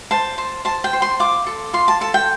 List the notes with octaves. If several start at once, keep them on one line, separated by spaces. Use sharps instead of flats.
C5 A5
C5
C5 A5
G5
C5
C6
F4 D6
A4
F4 C6
A5
A4 A5
G5